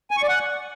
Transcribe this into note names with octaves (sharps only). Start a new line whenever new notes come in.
G#5
C#6
D5
F#5